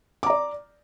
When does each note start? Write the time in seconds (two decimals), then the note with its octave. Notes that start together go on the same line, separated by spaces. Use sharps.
0.23 D6
0.26 A#5
0.30 D5